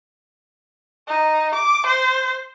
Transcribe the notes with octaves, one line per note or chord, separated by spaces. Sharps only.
D#4
D6
C5